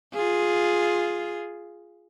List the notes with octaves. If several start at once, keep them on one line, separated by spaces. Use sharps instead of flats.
F4 G#4